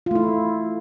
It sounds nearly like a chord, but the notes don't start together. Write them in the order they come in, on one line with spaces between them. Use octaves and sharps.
F4 A3 E4